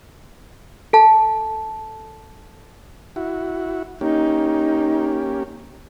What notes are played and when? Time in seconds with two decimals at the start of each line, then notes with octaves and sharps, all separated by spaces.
0.93 A4 A5
3.16 E4 F#4
4.01 A#3 C#4 D#4 G4